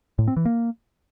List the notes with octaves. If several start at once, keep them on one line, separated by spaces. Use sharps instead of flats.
A2
C4
E3
A#3